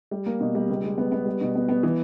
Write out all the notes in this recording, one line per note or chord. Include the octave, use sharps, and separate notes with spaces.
G3
A#3
B2
G3
C#2
G#3
B3
B3
G3
B2
B3
B3
E3